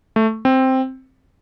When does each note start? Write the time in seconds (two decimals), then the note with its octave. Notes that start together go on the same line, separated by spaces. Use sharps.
0.16 A3
0.45 C4